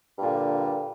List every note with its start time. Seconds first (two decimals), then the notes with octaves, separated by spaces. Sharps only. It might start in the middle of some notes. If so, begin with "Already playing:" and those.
0.18 G2
0.21 A#2
0.24 D3